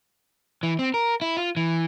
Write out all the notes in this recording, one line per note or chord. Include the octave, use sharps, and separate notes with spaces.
E3
C4
A#4
E4
F4
E3